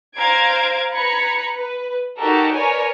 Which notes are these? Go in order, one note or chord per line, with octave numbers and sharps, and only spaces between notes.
C5 F5 A#5 G#6 D7
B4 A#5 B5 G#6 C#7
B4
D#4 F#4 G4 A4 A#4
A#4 B4 C#5 D5 G#5